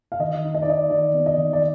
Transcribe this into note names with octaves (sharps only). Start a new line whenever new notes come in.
F5
D#3 D#5
D#4
D#5
D5
D#4 D#5
D#3 D5
B3
D#5
D#3
D5